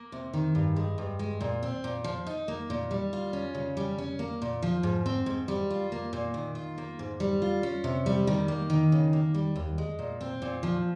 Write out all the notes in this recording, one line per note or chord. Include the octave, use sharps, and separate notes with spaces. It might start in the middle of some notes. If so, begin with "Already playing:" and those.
Already playing: A#3
C3
D#3
G2
G#3
G2
G#3
A#2
C4
A#2
F3
D#4
A#3
A#2
G3
F4
C#4
C#3
G3
C#4
A#3
A#2
F3
G#2
C4
G#2
G3
F4
A#3
A#2
D#3
F4
A#3
G#2
G3
F4
C#4
C3
G3
D#3
A#3
D#3
C#3
A#3
G3
D#2
G#3
A#2
C4
A#2
F3